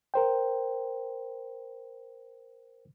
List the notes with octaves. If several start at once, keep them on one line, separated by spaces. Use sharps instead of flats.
A#4 C5 G5